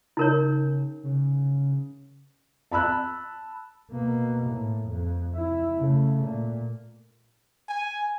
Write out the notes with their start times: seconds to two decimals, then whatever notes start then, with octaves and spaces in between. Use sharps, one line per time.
0.17 C#3 D#4 A#4 C#5
1.03 C#3
2.72 A5 B5 E6 F#6
3.91 B2 A#3
4.48 A2
4.88 F2
5.35 E4
5.78 C#3 A3
6.24 A#2
7.69 G#5